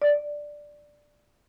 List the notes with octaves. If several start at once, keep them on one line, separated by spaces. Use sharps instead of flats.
D5